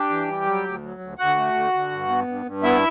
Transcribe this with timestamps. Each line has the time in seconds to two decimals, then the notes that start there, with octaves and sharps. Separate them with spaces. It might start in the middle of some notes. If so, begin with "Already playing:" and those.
Already playing: D4 G4 G5
0.10 E3
0.28 G3
0.46 F#3
0.65 D2
0.82 F#3
1.01 D2
1.18 D2 F#4 F#5
1.36 A3
1.55 D3
1.73 D3
1.91 G2
2.09 B3
2.27 G2
2.46 G2
2.63 B3 E4 E5